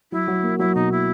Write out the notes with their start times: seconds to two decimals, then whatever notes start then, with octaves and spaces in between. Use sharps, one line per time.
0.12 F#3 E4
0.28 F#3
0.43 A#3
0.59 F#3 E4
0.75 B2 D#4
0.92 E4